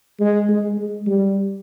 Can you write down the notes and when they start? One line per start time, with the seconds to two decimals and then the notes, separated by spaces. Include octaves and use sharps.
0.20 G#3
0.49 G#3
0.78 G#3
1.07 G3